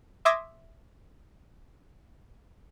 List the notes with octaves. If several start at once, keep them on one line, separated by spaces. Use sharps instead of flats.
E5 C6 D6 D#6 G#6 A#6